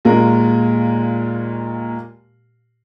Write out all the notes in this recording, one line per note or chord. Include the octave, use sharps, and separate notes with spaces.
D#2 A#2 G#3 A#4